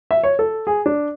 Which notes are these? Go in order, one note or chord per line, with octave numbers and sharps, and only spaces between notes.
E5
C#5
A4
G#4
D4